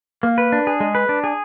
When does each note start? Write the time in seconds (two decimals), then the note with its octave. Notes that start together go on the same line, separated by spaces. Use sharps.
0.23 A#3
0.38 B4
0.52 D4
0.67 G#4
0.80 G#3
0.95 B4
1.09 D4
1.24 G#4